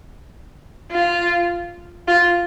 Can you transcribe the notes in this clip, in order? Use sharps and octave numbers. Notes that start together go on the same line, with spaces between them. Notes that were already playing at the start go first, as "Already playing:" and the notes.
F4
F4